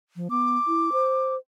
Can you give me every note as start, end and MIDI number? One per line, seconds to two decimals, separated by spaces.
0.16 0.28 53
0.31 0.57 59
0.31 1.34 86
0.67 0.90 64
0.93 1.37 72